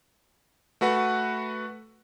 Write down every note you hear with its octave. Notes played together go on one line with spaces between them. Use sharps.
A3 F#4 B4 F#5